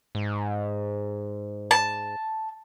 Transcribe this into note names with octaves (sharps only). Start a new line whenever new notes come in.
G#2
A5